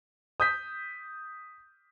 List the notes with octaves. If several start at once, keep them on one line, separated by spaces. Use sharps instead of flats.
D#6 G6 B6